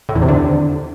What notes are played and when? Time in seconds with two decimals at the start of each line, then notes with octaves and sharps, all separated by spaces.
0.09 A2
0.15 E2
0.22 C3
0.28 D3